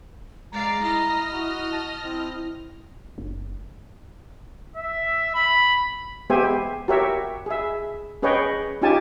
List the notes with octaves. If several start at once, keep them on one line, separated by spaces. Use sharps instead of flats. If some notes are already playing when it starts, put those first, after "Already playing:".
G#3 D5 F5 A#5
E4 D#5 F6
F#4
A5
C4 E4
F#1
E5
B5
G#3 B3 G4 C5 E5 G#5
F#4 G4 A#4 C#5 E5
G#4 E5
C#4 G#4 B4 C#5 D#5 G5
C#4 D#4 F4 G4 G#5 A5